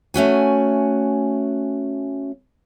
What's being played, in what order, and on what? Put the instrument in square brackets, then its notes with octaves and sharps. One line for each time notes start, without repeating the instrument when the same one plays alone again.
[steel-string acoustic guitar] A3 C#4 F#4 G#5